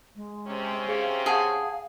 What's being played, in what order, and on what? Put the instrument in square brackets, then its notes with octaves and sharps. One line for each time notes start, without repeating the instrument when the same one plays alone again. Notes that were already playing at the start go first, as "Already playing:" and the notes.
[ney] G#3
[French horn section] C3 C4 C#4
[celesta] G#4 [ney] F5
[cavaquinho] G#4 [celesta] F#5 A5